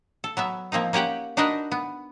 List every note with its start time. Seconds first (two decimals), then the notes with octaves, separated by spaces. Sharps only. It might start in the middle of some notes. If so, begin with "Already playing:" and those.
0.24 A4
0.37 F#3 B3 E5
0.72 F3 A#3 C4 D#4
0.93 A#3 C#4 G4 F#5 G5
1.37 D4 D#4 F#4 A#4 B4 D#5
1.72 B3